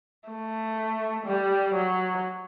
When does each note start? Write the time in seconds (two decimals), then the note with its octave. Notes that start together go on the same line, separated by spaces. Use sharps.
0.29 A3
1.26 G3
1.75 F#3